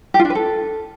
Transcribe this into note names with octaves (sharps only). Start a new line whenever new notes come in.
G4
F4
D4
B4
A4